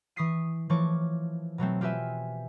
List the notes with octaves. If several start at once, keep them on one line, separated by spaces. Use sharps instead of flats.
E3 C#6 D#6 B6 C7 D#7
E3 F3 A3 C#5 C#6 D6
B2 F#3 A3 C4
F4 G4 B4 E5 G#5